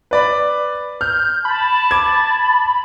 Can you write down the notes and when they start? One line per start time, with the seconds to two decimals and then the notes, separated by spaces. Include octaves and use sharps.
0.11 B4 D5 B5
1.01 F6 G6
1.45 A5 B5
1.91 D6 G#6